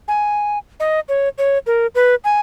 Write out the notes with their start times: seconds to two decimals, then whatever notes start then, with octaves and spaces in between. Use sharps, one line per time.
0.08 G#5
0.80 D#5
1.09 C#5
1.38 C#5
1.67 A#4
1.95 B4
2.24 G#5